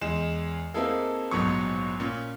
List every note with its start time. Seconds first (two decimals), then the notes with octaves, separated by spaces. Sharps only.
0.01 E2 G#3 E7
0.74 A#3 C4 D#4 E4 G#4 A4
1.31 A#1 G#2 B2 F#3 C#6
2.00 A#2 C#4